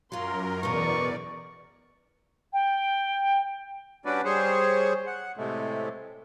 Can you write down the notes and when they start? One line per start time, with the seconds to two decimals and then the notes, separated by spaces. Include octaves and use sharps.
0.12 F#2 F#3 F4 A#4 C6
0.63 E2 B2 D3 B3 A#4 D5 C#6
2.53 G5
4.05 G3 C#4 D4 F#4 B4 D5
4.25 G3 G#4 C5 C#5
5.07 F#5
5.37 A2 C3 G#3 A3